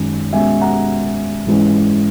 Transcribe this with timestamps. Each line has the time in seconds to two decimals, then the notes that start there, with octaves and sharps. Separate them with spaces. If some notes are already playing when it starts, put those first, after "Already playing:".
Already playing: F#2 D#3 G#3 C#4
0.33 B2 G#3 C#4 E5 G#5
0.61 F#5 A#5
1.47 G#2 E3 G#3 C#4